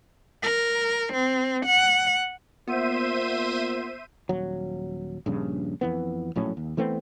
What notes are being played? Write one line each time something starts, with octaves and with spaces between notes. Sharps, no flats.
A#4
C4
F#5
A#2 B3 C5 E5 D#7
D#1 F#3
A#1 G2 C#3
F2 E3 B3
A#1 A2 F#3 C#4
D#2
E3 A3 B3 C4